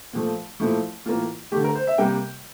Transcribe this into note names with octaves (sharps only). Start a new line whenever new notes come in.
A#2 F3 A3
A#2 F3 A3 E4
A2 E3 A#3 F4
D3 A3 G4
A#4
C5
E5
C3 G3 A#3 G5